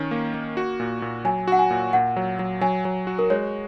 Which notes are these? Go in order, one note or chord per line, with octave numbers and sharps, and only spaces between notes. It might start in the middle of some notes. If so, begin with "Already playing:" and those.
Already playing: D#3 C#4
A#3
A#3
F#4
A#2
A#2
F#3 G#5
F#4 F#5
G#5
A#2
A#2 F#5
F#3
F#3
F#3 G#5
F#3
F#4
A#4
G#3 C#5